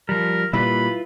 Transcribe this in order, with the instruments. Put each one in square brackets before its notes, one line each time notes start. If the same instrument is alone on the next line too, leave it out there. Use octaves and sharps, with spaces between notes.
[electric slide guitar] F3 G3 [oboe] A#4
[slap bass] A#2 G3 [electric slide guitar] E4 F4 B4 [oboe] B5